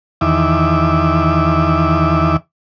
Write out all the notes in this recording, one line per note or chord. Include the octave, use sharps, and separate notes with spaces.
E2 D#3 E5 D6